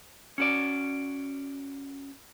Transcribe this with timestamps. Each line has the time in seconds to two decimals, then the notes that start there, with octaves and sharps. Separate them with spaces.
0.38 C#4 F#4 D5